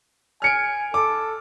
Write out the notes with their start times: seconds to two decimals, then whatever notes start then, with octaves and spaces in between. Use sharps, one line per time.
0.42 G#5 F6 C#7 D7
0.94 A4 D6